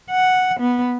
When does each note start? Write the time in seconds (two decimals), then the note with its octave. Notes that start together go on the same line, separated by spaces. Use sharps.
0.10 F#5
0.60 B3